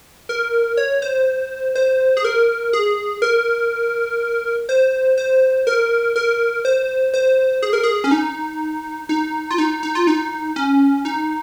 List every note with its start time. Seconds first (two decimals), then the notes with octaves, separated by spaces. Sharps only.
0.29 A#4
0.77 C#5
1.02 C5
1.75 C5
2.17 G#4
2.24 A#4
2.73 G#4
3.22 A#4
4.69 C5
5.18 C5
5.67 A#4
6.16 A#4
6.65 C5
7.14 C5
7.63 G#4
7.73 A#4
7.83 G#4
8.04 C#4
8.11 D#4
9.09 D#4
9.51 F4
9.58 D#4
9.83 D#4
9.95 F4
10.07 D#4
10.56 C#4
11.05 D#4